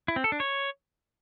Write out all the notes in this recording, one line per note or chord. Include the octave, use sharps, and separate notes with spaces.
E4
C4
A4
D4
C#5